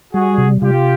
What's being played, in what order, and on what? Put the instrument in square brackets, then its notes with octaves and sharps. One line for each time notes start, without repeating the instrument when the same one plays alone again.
[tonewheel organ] G3 [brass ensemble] F#4 G#4
[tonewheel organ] C3
[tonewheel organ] C3 [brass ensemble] F4 G4